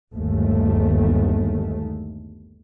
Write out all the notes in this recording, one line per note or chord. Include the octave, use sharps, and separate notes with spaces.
G1 D#2 G#3 A3